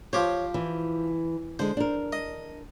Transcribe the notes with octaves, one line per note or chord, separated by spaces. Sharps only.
F3 G4 C5 C#5
E3
D3 G#3 C5
D4 A#4
D#5